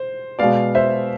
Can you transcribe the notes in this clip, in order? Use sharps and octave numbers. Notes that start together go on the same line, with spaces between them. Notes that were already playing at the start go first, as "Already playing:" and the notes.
Already playing: C5
B2 G#3 B3 D5 F5
C5 E5